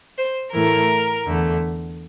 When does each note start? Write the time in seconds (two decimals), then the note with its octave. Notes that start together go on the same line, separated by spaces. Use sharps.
0.18 C5
0.54 A2 E3 A3 A#4
1.25 E2 D3 A3